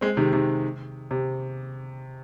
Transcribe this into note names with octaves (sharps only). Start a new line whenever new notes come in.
G#3 C4
C3 D#3
C3 D#3
C3